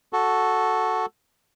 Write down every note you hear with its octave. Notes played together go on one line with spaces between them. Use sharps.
F#4 A4